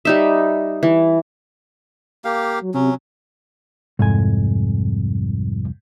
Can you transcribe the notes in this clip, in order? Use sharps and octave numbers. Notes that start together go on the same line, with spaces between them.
G3 D#4 E5
E3
A#3 G4 F5
F#3
C3 F#3 C#4
C2 F2 G#2 G#5